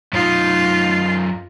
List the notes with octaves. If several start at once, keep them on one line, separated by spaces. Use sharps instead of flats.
F#2 D#4 F4